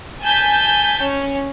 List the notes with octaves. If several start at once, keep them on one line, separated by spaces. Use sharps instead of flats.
G#5 A5 G6 B6
C#4